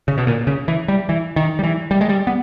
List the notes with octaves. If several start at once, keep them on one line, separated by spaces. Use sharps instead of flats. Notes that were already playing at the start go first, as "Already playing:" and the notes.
C#3
B2
A#2
C#3
E3
G3
E3
D#3
G3
E3
G3
G#3
G3
B3